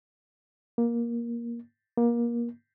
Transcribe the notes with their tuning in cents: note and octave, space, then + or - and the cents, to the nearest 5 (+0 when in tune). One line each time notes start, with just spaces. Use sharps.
A#3 +15
A#3 +25